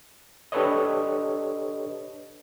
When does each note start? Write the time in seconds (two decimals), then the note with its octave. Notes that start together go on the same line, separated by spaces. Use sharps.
0.52 D4 G4 A4 B4 C#5 D#5